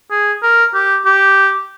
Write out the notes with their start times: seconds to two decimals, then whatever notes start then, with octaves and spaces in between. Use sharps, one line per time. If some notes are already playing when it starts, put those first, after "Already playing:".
0.11 G#4
0.42 A#4
0.74 G4
1.05 G4